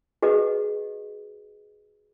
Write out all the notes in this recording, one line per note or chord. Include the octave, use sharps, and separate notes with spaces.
F#4 G#4 B4 D#5